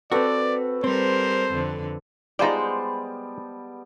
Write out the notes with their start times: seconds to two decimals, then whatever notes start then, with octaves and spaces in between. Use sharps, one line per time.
0.12 C4 F#4 A4 B4 D5 G5
0.84 G3 C4 A#4 C5
1.52 F2 D3
2.39 G3 G#3 B3 D#4 F4 C5 D5 A5